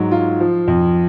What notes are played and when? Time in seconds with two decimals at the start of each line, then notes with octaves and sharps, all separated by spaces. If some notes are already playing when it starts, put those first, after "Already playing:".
Already playing: G#2 F#3
0.11 F4
0.40 F3
0.67 F2